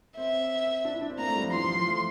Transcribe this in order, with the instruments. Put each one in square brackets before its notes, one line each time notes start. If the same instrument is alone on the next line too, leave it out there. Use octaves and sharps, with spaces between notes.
[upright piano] C4 [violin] E5
[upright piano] D4
E4
D4
C4
[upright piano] A#3 [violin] A#5
[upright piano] A3
G3
F3
[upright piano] E3 [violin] C6
[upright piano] F3
F3
A3